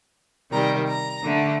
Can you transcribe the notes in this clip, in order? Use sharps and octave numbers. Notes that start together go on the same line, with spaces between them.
C3 D#3 G3 A#5
A#5
D3 A3